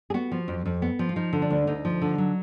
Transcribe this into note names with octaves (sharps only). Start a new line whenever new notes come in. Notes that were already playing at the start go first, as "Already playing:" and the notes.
G#4
B3 F#4
F3
F2
F2
B3
F3
F4
F3 D#4
D3
D4
D2
D2 D#4
F3
D3
F#3